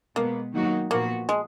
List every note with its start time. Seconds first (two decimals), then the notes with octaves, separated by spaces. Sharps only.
0.15 B2 G#3 A#3 B3
0.53 D#3 F#3 A#3 D#4 F#4
0.91 A#2 F3 A#3 B3 F#4
1.29 G#3